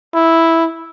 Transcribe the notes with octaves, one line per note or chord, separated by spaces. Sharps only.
E4